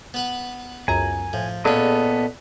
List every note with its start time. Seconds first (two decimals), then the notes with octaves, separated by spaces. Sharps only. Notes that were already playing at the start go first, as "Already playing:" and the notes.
0.14 B3 B4 F#5
0.88 C#2 F#2 G#5 A#5
1.33 A2 F3
1.65 A#2 B3 C#4 G#4 A4 D5 D#5 A5